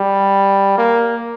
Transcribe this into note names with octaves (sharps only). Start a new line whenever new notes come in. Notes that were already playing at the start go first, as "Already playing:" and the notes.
Already playing: G3
A#3